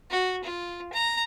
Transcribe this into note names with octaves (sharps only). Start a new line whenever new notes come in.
F#4
F4
A#5